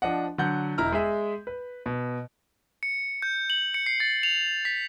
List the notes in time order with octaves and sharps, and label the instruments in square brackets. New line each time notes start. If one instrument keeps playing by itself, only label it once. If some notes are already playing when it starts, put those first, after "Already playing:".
[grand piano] F3 D4 D#5 F#5
D3 F#3 F#5 G6
E1 E4 A#5 F6
G#3 G#4 E5
B4
B2
[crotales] C#7
G6
F#7
C#7
C7
A6
F7
B6